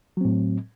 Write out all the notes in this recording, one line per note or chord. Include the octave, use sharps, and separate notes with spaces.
A2 F#3 C4